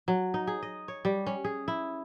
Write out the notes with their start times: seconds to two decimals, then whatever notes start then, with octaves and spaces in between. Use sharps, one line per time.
0.08 F#3
0.34 D#4
0.47 G#4
0.63 D#5
0.88 C#5
1.05 G3
1.27 C#4
1.44 G#4
1.68 E4